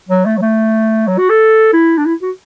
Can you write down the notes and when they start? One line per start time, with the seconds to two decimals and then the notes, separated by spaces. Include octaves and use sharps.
0.09 F#3
0.26 A3
0.38 F#3
0.42 A3
1.08 F#3
1.18 F#4
1.30 A4
1.73 E4
1.98 D4
2.06 E4
2.22 F#4